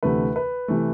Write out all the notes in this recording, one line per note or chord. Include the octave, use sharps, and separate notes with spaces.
D2 C3 E3 A3 B4
B4
C3 E3 A3